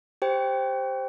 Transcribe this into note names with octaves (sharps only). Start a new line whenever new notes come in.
G4 C5 G5